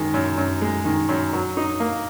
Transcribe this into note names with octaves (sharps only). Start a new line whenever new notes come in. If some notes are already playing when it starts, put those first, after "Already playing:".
Already playing: F#2 D#3 G#3
F#2
F#2
G#3
D#3
F#2
F#3
D#4
A#3